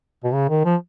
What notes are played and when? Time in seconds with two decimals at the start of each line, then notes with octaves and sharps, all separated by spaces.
0.24 B2
0.33 C#3
0.49 D#3
0.65 F3